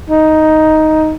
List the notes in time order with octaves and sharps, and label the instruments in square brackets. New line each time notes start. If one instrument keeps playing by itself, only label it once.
[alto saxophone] D#4